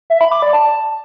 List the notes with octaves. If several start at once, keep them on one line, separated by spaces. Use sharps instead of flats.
E5
B5
D6
D5
A5